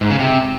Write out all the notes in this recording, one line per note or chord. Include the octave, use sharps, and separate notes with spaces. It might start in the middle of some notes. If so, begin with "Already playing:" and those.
G#2
C#3
C3